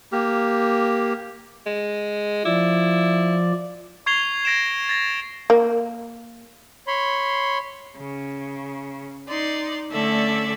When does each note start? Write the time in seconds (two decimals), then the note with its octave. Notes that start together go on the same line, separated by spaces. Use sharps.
0.12 A#3 G4
1.67 G#3
2.45 F3 E4 D5
4.06 C#6 G#6 C7 F7 G7
4.45 G#6 A#6 D7 E7
4.89 A6 A#6
5.50 A#3
6.87 C#5 B5 C6
7.97 C#3
9.28 D#4 D5 C6
9.91 D3 A3 C#4 A4 D5 E5